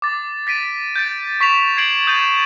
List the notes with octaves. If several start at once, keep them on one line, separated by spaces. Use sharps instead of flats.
D6 A6
A6 B6 D7 D#7
G6 A6 D7
C#6 B6 E7 F7
G#6 C7 D7 F#7
D#6 G6 A6 D#7 E7